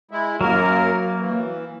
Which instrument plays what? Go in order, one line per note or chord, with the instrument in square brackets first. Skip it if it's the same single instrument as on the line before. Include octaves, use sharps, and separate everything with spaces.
[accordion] G#3 E4
[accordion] F#2 A#4 [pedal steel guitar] F#3 A#3
[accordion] E3